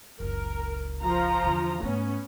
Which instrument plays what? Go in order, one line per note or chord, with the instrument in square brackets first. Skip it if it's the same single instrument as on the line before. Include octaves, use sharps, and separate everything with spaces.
[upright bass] F#1 C#2 [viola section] A#4
[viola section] F3 F4 A#5
[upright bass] E2 D3
[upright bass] G#2 A3 [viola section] B3 C#4